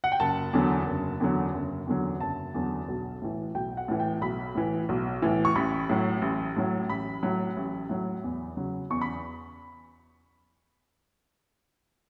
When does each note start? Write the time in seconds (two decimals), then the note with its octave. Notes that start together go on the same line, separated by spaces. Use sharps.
0.04 F#5
0.12 G5
0.20 F#1 A5
0.53 E2 D3 F#3
0.87 F#1
1.20 E2 D3 F#3
1.54 F#1
1.87 E2 D3 F#3
2.21 F#1 A5
2.54 E2 D3 F#3
2.88 B1
3.22 A2 E3
3.55 B1 G5
3.77 F#5
3.88 A2 E3
4.00 G5
4.21 B1 B5
4.55 A2 E3
4.89 B1
5.22 A2 E3
5.45 C#6
5.55 A1 B5
5.89 A2 F#3
6.22 A1
6.56 A2 F#3
6.89 A1 B5
7.23 A2 F#3
7.57 A1
7.89 A2 F#3
8.24 E2
8.57 C#3 F#3
8.90 E2 C#6
9.01 B5